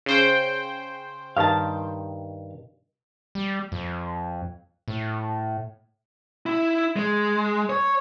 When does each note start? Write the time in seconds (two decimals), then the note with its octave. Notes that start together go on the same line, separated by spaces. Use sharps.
0.06 C#3 C5 G5
1.37 G2 D#3 F5 A5
3.35 G3
3.72 F2
4.88 A2
6.46 E4
6.96 G#3
7.70 C#5